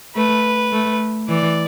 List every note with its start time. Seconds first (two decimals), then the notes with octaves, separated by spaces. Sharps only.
0.16 A3 B4
0.72 A3
1.28 E3 D5